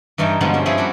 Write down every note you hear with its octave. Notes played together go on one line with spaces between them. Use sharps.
G2 E3 D#4 C#5 G5 A5
G2 B2 D3 F3 G#3 B3
C#4 G4 C5
F3 C4 E4 G#4 B4 C#5
G3 A#3 D4 D#4 F#4